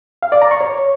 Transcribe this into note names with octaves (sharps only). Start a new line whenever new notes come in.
F5
D5
A#5
C#6
C#5